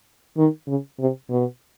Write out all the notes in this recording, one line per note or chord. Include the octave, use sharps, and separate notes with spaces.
D#3
C#3
C3
B2